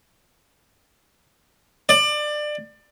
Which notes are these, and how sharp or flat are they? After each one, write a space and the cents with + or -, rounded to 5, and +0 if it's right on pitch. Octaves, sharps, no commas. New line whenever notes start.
D5 +25